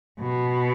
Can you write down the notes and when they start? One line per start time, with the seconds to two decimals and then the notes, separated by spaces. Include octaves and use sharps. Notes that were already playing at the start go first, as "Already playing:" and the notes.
0.19 B2